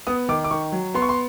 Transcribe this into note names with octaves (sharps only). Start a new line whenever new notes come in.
B3 D#6
D#3 D6
D6
D#3 C#6
F#3
B3 C6
C#6
C6